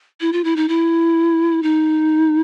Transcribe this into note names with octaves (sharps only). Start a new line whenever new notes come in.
E4
F4
E4
D#4
E4
D#4